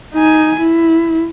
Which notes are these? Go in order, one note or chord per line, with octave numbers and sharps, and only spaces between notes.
D#4 G#5
E4